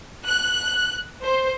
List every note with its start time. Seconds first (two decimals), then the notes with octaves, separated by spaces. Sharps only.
0.25 F#6
1.21 C5